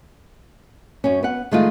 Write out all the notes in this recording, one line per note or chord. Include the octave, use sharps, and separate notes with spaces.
F#2 C#4
B3 F#5
D#3 F3 G#3 A3 D#4 F4